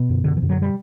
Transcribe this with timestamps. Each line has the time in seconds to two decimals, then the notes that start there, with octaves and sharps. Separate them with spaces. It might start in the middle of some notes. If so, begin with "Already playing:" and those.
Already playing: B2 B3
0.09 F#2 D3
0.24 D3
0.37 E3
0.42 F#2 D3
0.49 F#3
0.62 G3